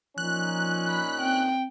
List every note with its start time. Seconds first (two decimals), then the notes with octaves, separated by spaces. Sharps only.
0.18 A#2 F3 C#4 D#4 F#6
0.88 B5
1.21 C4 G5